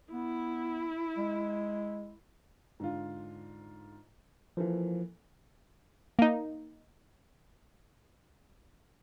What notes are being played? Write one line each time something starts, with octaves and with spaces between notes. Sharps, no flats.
B3 E4
G#3
G#2 D3 F4
E3 F3 A#3 A4
A#3 D#4